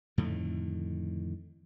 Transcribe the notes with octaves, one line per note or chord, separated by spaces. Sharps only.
F2 A2 D3 D#3